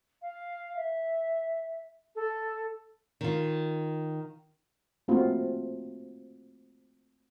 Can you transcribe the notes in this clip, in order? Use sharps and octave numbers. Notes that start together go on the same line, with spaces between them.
F5
E5
A4
D#3 F4
A3 A#3 C4 F4 F#4